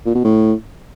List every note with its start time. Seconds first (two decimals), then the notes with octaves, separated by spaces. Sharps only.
0.06 A#2
0.15 B2
0.24 A2